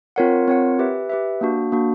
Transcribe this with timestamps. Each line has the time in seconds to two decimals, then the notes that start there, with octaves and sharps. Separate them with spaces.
0.16 C4 F4 A#4 C#5 F#5
0.48 C4 F4 A#4 C#5 F#5
0.79 G4 B4 E5
1.10 G4 B4 E5
1.41 A#3 D4 F#4
1.72 A#3 D4 F#4